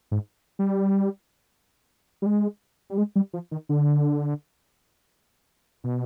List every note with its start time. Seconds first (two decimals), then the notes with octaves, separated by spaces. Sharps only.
0.11 G#2
0.59 G3
2.22 G3
2.26 G#3
2.90 G3
2.98 G#3
3.16 G3
3.33 F3
3.51 D#3
3.69 D3
5.84 B2